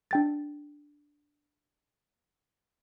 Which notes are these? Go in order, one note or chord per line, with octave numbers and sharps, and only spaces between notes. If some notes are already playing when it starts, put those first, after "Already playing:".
D4 G5 A6